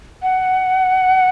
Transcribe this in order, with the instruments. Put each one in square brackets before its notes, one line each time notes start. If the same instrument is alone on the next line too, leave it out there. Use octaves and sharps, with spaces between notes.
[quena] F#5